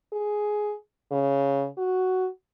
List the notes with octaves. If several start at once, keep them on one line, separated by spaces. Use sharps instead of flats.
G#4
C#3
F#4